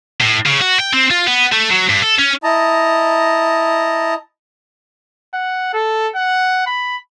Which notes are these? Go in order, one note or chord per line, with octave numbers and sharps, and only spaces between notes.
A2
C#3
F#4
G5
C4
F4
B3
A3
F#3
G2
A4
C#4
E4 D#5 A5 A#5
F#5
A4
F#5
B5